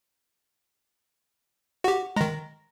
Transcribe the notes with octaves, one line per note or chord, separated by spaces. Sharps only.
F#4 G4 F#5
D#3 G#3 A#5 A#6